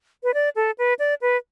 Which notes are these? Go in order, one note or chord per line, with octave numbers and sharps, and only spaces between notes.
B4
D5
A4
B4
D5
B4